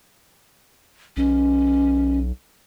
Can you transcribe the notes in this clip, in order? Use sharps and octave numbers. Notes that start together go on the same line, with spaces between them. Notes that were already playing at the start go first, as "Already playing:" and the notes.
B1 C#4